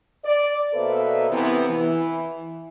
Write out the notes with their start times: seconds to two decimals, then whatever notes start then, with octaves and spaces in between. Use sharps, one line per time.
0.24 D5
0.74 B2 A#3 A4 B4 C5 E5
1.30 C3 E3 B3
1.69 E3